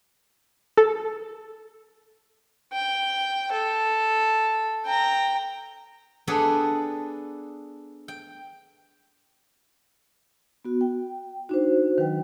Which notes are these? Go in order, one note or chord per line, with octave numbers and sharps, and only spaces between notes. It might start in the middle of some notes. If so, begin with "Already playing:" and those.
A4
G5
A4
G5 A#5
B3 D4 G#4 A4 B4 G5
G5
B3 F#4
G5
D4 D#4 F#4 C5
D#3 F#3 B4 G5